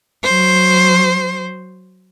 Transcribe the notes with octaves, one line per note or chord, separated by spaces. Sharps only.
F#3 C5